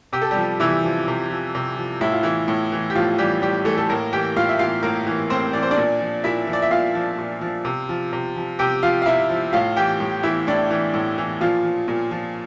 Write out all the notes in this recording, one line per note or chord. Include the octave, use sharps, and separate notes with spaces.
C3 G4
A4
G3 G4
F3
C3 E3 E4
F3
C3
F3
C3
F3
A2 E4
F4
E3 E4
A2
E3
G4
A2 F3 F4
E3 G3 G4
A2 G3 G4
E3 A3 A4
A4
A2 A#3 A#4
E3 G4 G5
A2 F4 F5
E5
E3 F4 F5
A2 A#3 A#4
E3
A2 C4 C5
E3 D5
C5
D4 D5
A#2
F3
A#2 E4 E5
F3
D5
E5
A#2 F4 F5
F3
A#2
F3
C3
F3
C3
F3
C3 G4 G5
F3 F4 F5
F5
C3 E4 E5
F3
A2 F4 F5
E3 G4 G5
A2
E3 E4 E5
A2 D4 D5
E3
A2
E3
A#2 F3 F4
F3
A#2
F3